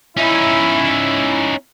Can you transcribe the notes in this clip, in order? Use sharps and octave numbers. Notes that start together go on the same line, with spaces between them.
C#4 D#4 E4